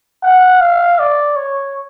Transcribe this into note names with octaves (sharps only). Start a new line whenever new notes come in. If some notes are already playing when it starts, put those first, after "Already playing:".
F#5
F5
D5
C#5